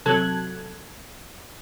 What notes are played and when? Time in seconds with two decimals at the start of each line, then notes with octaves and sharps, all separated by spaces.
0.06 C3 F#3 A4 F#6 G#6